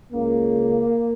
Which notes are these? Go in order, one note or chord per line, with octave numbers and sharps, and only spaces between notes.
C#2 C#3 A#3